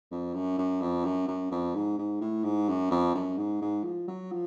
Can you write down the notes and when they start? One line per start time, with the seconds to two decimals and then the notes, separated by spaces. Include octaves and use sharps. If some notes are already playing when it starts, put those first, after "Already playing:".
0.11 F2
0.34 F#2
0.58 F#2
0.81 F2
1.04 F#2
1.28 F#2
1.51 F2
1.75 G#2
1.98 G#2
2.21 A2
2.44 G#2
2.69 F#2
2.91 F2
3.15 F#2
3.38 G#2
3.61 G#2
3.84 F3
4.08 F#3
4.31 F3